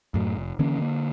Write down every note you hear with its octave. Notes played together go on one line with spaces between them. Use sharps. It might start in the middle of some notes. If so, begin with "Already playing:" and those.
F#2 A2 F#3
F1
D3 E3 A#3 C#4
D3 A#3